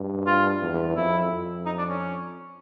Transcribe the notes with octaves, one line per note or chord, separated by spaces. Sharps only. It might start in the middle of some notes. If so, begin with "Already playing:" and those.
Already playing: G2
F4
E2
F2 E4
F2
D#4
D4
C#4